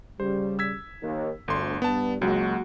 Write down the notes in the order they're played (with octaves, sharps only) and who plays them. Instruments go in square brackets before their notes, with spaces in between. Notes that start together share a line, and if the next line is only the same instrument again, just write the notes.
[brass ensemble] C#3 G3 [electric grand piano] C5
[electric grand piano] E6 G#6 B6
[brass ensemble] D#2
[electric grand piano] G1 C6 [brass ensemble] D2
[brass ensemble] G2 [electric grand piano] B3 A5
[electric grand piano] C#2 G#3 [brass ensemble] F#3 A#3 F#4